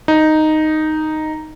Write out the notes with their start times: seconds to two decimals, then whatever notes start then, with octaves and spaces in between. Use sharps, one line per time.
0.08 D#4